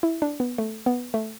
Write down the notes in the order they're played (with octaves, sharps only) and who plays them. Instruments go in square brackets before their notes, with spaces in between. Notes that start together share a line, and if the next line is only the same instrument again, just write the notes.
[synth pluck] E4
D4
B3
A3
B3
A3